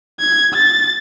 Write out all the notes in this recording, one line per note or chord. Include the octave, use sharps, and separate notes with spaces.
G#6
A6